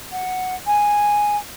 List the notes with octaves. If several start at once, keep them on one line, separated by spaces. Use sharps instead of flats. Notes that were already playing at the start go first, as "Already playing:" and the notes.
F#5
G#5